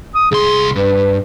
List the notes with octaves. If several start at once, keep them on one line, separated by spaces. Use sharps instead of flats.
D#6
C2 G#4 C6
G2 B4